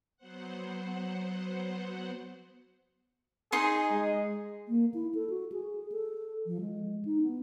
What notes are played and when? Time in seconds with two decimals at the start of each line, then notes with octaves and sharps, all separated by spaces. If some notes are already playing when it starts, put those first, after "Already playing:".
0.17 F#3 B3 C5 F#5
3.52 D#4 G#4 D#5 C6
3.91 G#3
4.68 A#3
4.94 E4
5.15 A4
5.30 F#4
5.52 G#4
5.92 A4
6.46 F3
6.61 G#3
7.05 D#4
7.22 B3